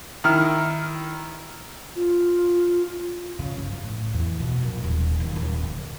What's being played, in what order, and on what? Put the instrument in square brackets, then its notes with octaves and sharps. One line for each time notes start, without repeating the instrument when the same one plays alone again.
[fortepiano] D#3 E4 F6
[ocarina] F4
[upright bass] C#3
G1
A2
E2
B2
A#1
D#1
D#2
D#1
D3